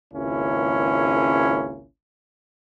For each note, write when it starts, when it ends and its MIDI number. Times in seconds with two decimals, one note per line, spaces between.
0.13 1.86 32
0.13 1.86 37
0.13 1.86 58
0.13 1.86 61
0.13 1.86 64